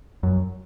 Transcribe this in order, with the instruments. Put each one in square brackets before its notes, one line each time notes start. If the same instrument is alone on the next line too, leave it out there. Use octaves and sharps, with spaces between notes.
[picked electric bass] F#2